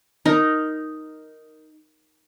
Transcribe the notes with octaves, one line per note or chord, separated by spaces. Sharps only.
D#4 A#4